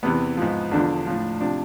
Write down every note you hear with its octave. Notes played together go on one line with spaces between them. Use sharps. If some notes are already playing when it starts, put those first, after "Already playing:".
E2 C3 E3 B3
G#2 F3
E2 D3 F3 D4
A2 F3
C3 F3 D4